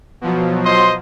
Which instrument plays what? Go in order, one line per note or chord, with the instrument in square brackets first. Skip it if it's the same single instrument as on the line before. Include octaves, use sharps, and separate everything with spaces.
[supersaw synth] B2 F3 F#3
[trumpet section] C5 D#5 [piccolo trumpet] C6